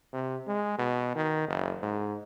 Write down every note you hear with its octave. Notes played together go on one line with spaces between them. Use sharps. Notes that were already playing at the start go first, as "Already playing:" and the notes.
C3
G#3
B2
D#3
F#1
G#2